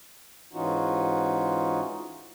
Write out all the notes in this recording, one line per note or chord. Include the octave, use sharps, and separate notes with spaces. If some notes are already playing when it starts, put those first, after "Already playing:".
G#2 E3 C#4 D#4 F4 F#4